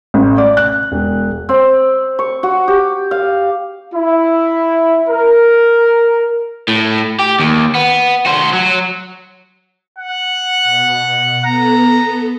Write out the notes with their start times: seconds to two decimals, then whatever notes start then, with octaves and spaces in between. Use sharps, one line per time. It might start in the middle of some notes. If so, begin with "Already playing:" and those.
0.14 A1
0.38 D5
0.57 F#6
0.92 E1
1.49 C4
2.19 C#6
2.43 F#4
2.68 G4
3.11 F5
3.94 E4
5.08 A#4
6.68 A2
7.19 G4
7.39 D#2
7.75 B3
8.26 F#4 C5
8.53 F#3
9.98 F#5
10.64 B2
11.45 B3 A4 A#5